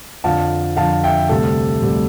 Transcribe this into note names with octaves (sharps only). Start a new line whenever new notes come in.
F2 D3 F3 F5 A5
F2 D3 F3 F5 A5
E5 G5
D2 C3 G3 A4
D2 C3 G3